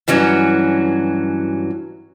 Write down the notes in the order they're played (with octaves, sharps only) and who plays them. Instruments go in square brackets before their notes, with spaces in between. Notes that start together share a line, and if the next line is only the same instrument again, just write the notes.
[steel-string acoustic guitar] G2 E3 F#3 C#4 F#4